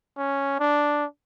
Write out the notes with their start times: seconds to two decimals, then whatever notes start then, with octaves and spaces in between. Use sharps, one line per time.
0.17 C#4
0.60 D4